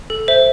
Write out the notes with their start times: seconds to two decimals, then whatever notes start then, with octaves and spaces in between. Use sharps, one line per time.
0.10 A4
0.28 C5 E5